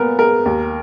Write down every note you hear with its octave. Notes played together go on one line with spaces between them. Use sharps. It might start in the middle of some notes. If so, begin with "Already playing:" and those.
Already playing: A#2 B3 A#4
G#3 A#4
D#2